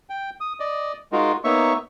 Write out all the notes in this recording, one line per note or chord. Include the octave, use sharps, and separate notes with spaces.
G5
D#6
D5 D#5
G#3 D#4 F4 F#4 A#4
A#3 B3 D#4 C#5 E5 C#6